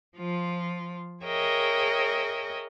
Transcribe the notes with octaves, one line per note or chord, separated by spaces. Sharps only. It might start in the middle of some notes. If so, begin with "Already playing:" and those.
F3 F4
G#4 A#4 C#5 D#5 E5 G5